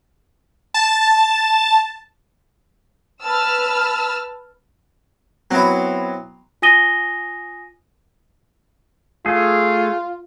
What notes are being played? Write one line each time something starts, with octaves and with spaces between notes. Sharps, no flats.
A5
B4 A5 E6 F6
F#3 B3 C4 E4
F4 G#5 D#6 A#6 D#7 G7
A3 F4 G#4